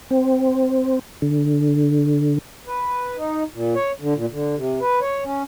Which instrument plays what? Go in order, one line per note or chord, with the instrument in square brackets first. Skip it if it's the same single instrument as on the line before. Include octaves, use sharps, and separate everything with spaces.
[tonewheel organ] C4
D3
[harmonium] B4
D#4
A#2
C#5
D3
A#2
D3
C3
B4
C#5
C#4